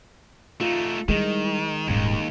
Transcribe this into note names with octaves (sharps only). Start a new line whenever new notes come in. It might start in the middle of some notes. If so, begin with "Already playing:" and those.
A3 D#4 F4
D#3 G3 G#3 E4
D#1 D#2 G#2 D#3